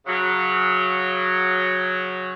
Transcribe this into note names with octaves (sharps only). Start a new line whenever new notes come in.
C#3 F#3